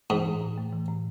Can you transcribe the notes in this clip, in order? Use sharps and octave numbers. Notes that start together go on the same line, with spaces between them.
G#2 E3
A2
A2
A3
E3
A2